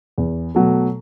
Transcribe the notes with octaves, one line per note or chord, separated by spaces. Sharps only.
E2
B2 F#3 A3